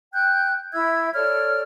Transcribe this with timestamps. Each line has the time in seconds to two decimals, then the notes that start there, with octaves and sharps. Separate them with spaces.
0.13 G5 F#6 G6
0.72 E4 E5 E6 G#6
1.14 A4 C#5 D5 F6